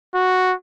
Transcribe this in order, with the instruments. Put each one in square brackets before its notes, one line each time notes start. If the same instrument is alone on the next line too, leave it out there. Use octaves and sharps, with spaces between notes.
[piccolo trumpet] F#4